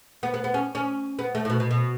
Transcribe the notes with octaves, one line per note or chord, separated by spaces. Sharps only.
B3
B3
B3
C#4
C#4
B3
A3
A2
B2
B2
B2